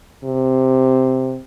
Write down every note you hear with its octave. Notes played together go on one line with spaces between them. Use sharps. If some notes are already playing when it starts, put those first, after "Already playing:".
C3